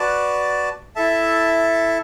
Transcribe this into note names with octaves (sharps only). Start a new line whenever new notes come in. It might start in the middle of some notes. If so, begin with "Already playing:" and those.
Already playing: F#4 B4 D5 A5
E4 A4 E5 A5